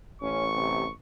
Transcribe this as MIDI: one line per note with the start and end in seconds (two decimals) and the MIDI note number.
0.22 0.89 33
0.22 0.45 61
0.22 0.93 85
0.53 0.85 48